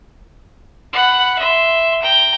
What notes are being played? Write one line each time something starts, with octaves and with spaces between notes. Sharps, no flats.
F#5 B5
E5 C6
G5 A#5